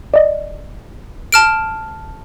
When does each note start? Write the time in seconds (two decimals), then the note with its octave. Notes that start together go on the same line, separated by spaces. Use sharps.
0.14 D5 D#5
1.32 A5 F6 D7